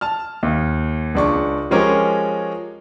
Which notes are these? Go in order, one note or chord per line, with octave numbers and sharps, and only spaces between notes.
A5 F6
D#2
C#2 D4 C#6
F3 G#3 C#4 G4 A#4 C#5